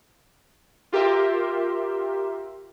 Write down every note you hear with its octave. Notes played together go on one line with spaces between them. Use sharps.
F4 G4 A#4 E5 C6